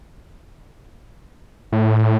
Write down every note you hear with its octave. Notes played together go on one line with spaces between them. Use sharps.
A2